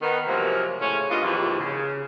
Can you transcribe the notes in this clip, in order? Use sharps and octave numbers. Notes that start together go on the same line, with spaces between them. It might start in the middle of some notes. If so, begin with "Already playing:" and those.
D#3 B3
C3 F3 F#3 G#3 A#3
A2 C#3 C#4
G2 A#3 B3 F4 D#5
D#2 G#2 C3 E3 F3
C#3